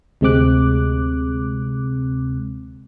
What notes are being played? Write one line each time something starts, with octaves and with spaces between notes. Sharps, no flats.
D2 C3 G#3 C4 D6 F#6